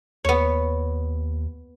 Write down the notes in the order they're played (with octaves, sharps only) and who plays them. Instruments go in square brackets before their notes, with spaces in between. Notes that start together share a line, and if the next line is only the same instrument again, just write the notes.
[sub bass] D#2 [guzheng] B3 C#5